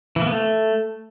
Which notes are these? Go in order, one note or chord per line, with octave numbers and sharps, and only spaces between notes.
E3
A#3
B3
A3